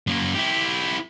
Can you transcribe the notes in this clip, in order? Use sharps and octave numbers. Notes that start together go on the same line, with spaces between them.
F#2 A#3
E4 G4